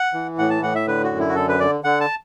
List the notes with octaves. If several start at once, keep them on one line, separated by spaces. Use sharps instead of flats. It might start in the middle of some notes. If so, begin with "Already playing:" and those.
Already playing: F#5
E3
A2 F#5
A5
A2 F#5
E5
D3 B4
F#4
F#2
E4
F#4
D3 A4
B4
D3 D5
D3 F#5
A5